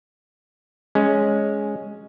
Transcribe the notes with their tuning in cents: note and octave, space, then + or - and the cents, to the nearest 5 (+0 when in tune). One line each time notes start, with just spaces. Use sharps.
G#3 +0 C#4 +0